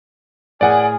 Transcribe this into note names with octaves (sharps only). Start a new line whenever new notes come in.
A2 G#4 A#4 D5 F#5 G#5